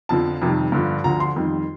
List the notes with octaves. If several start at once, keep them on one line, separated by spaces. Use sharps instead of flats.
F2 D3 F3 A5
F2 C3 D#3 G3
G2 D3 F3
D2 D3 F3 A#5
C6
F2 D#3 G3